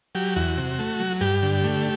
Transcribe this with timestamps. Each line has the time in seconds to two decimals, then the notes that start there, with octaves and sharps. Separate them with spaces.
0.15 F#3 G4
0.36 E2 F#4
0.57 C3
0.79 A3
1.00 F#3
1.21 G2 G4
1.43 D3
1.64 A3